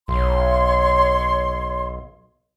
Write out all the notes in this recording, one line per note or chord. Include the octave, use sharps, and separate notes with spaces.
B1 C#5 C6